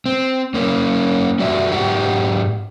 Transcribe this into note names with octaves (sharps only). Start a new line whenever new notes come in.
C4
A#3 C#4
G3 F#4 D5 E5
G#2 G4 E5 F#5 A#5